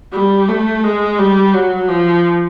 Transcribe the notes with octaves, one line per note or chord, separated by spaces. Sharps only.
G3
A3
G#3
G3
F#3
F3